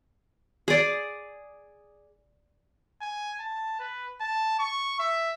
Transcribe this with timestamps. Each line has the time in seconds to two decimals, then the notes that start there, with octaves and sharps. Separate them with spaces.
0.68 G#4 D5
3.01 G#5
3.40 A5
3.80 B4
4.20 A5
4.59 C#6
4.99 E5